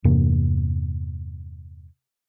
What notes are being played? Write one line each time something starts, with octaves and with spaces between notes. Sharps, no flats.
E2 G2 C3 A#3